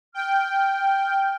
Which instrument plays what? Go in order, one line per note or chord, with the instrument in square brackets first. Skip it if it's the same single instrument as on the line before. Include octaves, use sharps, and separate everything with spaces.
[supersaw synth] G5 [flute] F6